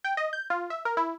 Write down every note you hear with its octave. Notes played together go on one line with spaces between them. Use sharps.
G5
D#5
G6
F4
E5
A#4
E4